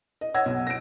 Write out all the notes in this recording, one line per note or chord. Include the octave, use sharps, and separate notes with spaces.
D#5
C#5 D#5 F#5 E6 G#6 A#6
B1
A#6 D7